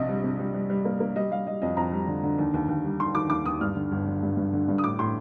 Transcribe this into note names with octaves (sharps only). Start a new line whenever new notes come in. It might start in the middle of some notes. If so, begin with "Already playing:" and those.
Already playing: A#1 C3 D#5
G3
C3
G3
G3
G3
A#3
A#3
G3 D#5
G3 F5
G3 D#5
F2 D#5
F2 A#5
G3
D3
D3
D#2
D#2
D#2
G3
D#3 C6
D#3 D6
D#2 D6
D#2 D#6
G2 F6
D3
G1
D3
G2
G2
D3
G2
D#6
A2 D6
A2 C6